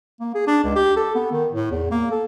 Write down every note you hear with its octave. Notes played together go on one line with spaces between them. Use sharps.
A#3
G#4
D4
C#2
G4
A4
B3
D#3
A2
E2
A#3
A4